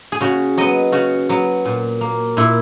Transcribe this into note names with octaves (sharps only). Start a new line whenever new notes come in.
G#4
C#3 F#4
F#3 B3 D#5
C#3 F#4
F#3 B3
A#2
A#3
A#2 E4